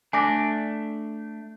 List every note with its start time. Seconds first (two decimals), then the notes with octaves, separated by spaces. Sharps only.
0.13 A3 D4 G#5 D6 A#6